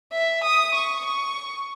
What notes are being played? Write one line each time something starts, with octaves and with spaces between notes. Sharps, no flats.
E5
D#6
C#6
C#6